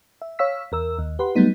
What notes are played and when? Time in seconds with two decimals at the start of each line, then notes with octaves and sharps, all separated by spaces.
0.22 E5
0.39 C#5 F5 E6 B6
0.72 E2 A#4 E6
0.99 D#2
1.19 G4 B4 F#5 C6
1.36 F#3 G3 A3 B3 D#4